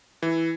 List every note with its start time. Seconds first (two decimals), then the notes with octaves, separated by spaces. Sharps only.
0.22 E3